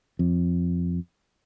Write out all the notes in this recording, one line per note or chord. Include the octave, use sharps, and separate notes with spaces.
F2